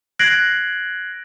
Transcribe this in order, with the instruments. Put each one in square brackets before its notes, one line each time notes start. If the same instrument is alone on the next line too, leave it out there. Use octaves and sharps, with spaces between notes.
[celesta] F#6 G#6 A#6 C7 D7 F#7